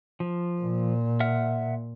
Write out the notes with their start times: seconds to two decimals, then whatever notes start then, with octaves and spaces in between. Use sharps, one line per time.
0.20 F3
0.61 A#2
1.20 E5 F#5 F6